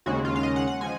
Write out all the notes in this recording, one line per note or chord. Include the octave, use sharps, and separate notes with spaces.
D#2 C#3 G#3 F#4
F4
F5
D#5
F#5
F#5
F3 G#3 G#5